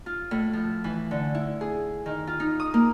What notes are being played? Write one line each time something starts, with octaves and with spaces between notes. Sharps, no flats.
F4
A2
F3
E3
D3
E4
G#4
D#3
F4
D#4
D#6
A#3